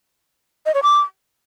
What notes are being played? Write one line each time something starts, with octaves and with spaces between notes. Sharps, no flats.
D#5
C#5
D6